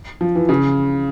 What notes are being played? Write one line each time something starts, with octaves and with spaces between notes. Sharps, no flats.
F3
E3
C#3